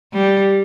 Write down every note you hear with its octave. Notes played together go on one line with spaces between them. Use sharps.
G3